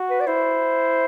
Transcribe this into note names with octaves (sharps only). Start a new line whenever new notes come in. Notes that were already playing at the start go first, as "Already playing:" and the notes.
Already playing: F#4
B4
D5
E4 C5